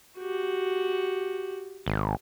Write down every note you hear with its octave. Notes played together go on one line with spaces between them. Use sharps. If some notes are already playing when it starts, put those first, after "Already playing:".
F#4 G4
G#1